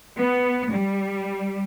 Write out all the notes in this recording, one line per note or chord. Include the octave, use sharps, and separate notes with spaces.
B3
G3